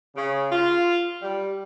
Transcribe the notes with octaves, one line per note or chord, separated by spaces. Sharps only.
C#3
F4
G3